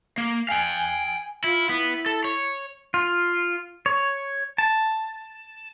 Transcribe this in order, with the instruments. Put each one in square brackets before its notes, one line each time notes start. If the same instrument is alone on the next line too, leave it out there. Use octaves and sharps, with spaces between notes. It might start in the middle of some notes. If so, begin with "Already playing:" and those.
[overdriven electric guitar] A#3
[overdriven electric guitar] F5 G5 [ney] G#5
[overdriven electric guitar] E4 [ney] F4
[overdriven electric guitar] B3 [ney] E4
[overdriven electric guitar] A4
C#5
[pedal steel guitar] F4
C#5
A5